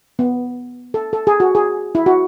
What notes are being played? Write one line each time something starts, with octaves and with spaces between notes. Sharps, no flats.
B3
A4
A4
G#4
F#4
G#4
E4
F#4